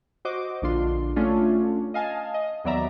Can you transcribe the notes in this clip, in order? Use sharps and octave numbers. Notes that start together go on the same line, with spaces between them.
F#4 C5 D#5 D6
A#1 D3 D4 F4 C6
A3 C#4 D4 F4
D#5 F5 G#5 A5
D#5
D#2 F#3 B3 D5 E5 A#5